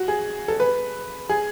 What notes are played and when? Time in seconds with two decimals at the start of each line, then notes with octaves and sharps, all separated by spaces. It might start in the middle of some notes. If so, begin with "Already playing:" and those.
Already playing: F#4
0.08 G#4
0.48 A4
0.60 B4
1.29 G#4